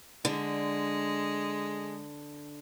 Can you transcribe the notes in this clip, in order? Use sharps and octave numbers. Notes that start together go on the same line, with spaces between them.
D3 G#3